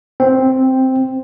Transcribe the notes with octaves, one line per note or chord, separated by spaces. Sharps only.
C4